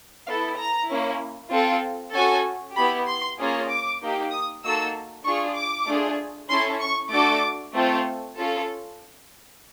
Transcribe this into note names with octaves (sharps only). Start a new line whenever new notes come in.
B3 E4 A4 F5
A#5
A#3 C#4 E4
C4 F4 A4
C#4 F#4 A4 G#5
B3 E4 G4 B5
C6
A#3 C#4 F4 G#4
D6
A#3 D#4 G4
D#6
A#3 D#4 F#4 A4 E6
D4 F4 G#4 C#6
D6
A3 D4 F4 G#4
C#4 E4 A4 C6
C#6
A3 D4 F#4 A4 D6
A3 C4 F4 A4
C#4 F4 A4